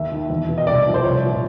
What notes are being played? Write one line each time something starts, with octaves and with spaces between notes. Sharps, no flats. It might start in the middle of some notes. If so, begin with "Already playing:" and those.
Already playing: D#2 E5
D#3
E2
B2
D#5
C2 D5
C3 F3
C5
C2 C#5
A#2 F3